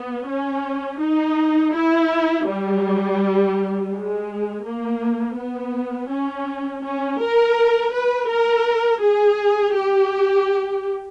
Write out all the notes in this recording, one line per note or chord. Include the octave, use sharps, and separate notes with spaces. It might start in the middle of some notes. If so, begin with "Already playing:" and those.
Already playing: B3
C#4
D#4
E4
G3
G#3
A#3
B3
C#4
C#4
A#4
B4
A#4
G#4
G4